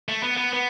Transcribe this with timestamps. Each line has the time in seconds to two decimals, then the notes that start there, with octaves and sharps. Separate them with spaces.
0.08 A3
0.23 B3
0.37 B3
0.53 B3